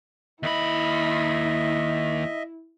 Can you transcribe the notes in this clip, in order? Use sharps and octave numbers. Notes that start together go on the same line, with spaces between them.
D#2 E4 D#5 E5 B5